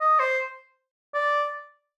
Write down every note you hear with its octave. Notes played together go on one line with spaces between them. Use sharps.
D#5
C5
D5